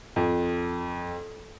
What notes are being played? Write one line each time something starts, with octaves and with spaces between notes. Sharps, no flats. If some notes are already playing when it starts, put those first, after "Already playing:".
F2